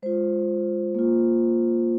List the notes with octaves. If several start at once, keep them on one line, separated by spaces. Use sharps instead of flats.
G#3 F4 C5
A#3 F4